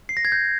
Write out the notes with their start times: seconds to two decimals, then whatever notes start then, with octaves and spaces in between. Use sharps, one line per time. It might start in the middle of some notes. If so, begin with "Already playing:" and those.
0.09 C7
0.17 A#6
0.25 G#6
0.32 G6